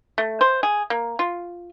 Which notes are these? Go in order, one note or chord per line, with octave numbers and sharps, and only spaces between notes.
A3
C5
G#4
A#3
F4